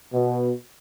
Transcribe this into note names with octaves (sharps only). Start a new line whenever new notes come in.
B2